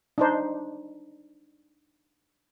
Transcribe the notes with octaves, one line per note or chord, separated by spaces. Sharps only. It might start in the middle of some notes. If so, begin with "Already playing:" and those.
D4 D#4 C5